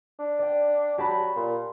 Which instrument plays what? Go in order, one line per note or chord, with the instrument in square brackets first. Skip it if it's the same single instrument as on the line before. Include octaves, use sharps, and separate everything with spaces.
[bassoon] D4
[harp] D5 G5
[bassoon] F#3 [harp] G4 A5 B5
[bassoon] A#2 [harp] C6